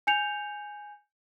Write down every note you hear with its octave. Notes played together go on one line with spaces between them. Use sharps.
G#5 G6 C#7 F7